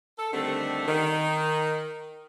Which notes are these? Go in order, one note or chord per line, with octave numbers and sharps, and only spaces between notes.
A4
D3 D#3 G3 A3 C4
D#3